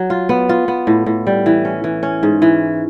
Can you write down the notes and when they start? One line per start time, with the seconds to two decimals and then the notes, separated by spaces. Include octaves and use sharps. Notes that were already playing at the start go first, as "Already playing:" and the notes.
Already playing: F#3
0.10 F4
0.29 B3
0.49 F4
0.68 B3
0.87 A2
1.06 A2
1.27 G3
1.46 E3
1.65 C#4
1.84 E3
2.03 C#4
2.23 G#2
2.42 E3